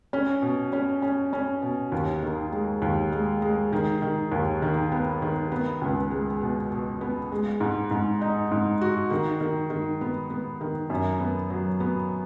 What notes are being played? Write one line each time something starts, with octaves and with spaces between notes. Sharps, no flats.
C#4
B2
C#4
C#4
C#4
B2
D#2
D#3
G#3
D#2
G#3
G#3
D#3
D#3
D#2
D#3
B3
D#3
B3
C#2
G#3
B2
B2
B3
G#3
G#2
G#2
D#4
G#2
F#4
D#3
D#3
D#3
B3
B3
D#3
F#2
B3
F#3
B3